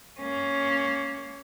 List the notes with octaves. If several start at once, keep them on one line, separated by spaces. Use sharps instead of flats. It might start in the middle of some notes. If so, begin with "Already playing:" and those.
A#3 C#4